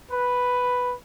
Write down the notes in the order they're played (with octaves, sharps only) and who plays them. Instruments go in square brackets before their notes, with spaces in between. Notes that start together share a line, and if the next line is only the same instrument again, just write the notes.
[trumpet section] B4